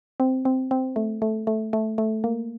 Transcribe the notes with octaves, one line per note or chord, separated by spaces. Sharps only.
C4
C4
C4
A3
A3
A3
A3
A3
A#3